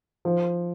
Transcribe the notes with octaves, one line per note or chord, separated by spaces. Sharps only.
F3